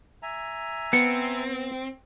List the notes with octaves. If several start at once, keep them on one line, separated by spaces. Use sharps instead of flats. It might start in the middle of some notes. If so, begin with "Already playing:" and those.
E5 G#5 A#5
B3 C4 C#7